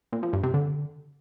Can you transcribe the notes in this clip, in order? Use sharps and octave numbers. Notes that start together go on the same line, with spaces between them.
A#2
F3
G2
C3
D3